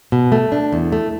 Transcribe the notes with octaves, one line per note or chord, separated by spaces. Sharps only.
B2
A3
D4
E2
A3